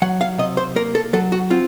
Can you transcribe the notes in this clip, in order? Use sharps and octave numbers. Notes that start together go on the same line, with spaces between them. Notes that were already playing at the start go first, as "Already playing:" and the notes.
F#3 F#5
F5
C3 D#5
C5
A#3 A#4
A4
F#3 A4
F#4
C4 F4